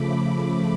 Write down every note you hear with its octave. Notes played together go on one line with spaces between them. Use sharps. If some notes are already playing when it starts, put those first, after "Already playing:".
Already playing: C#3 F3 A3 B5 D6